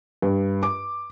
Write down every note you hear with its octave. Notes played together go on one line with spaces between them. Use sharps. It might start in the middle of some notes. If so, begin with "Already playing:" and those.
G2
D6